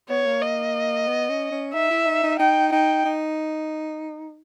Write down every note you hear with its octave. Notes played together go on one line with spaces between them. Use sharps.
B3 C#5
A#3
D#5
B3
C#4
C#4
D#4 E5
E4
D#4
D#4
D#4 G5
D#4 G5
D#4